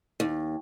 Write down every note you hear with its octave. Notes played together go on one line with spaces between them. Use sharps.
D#2